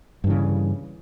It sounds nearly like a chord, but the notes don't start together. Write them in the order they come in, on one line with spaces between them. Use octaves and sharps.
G2 E3 C#3